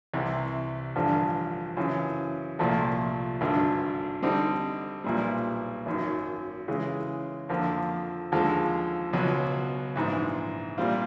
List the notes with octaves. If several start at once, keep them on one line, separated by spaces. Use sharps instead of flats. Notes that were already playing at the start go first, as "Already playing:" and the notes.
C2 C3 E3
A1 G2 D3 F3
F#2 C#3 E3
C2 A#2 F3 A3
G#1 G2 D3
D3 G3 C4 D#4
B1 A#2 G3
G#1 F#2 D#3
C#3 E3 G#3
F2 D3 F3 A#3
D#2 D3 F3 G#3
C#2 B2 F#3
A#1 G#2 E3
A#2 G3 C4 F4